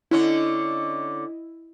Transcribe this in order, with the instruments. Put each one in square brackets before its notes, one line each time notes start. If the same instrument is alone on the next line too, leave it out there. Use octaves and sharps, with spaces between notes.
[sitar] D3 C#4 [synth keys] E4 D#5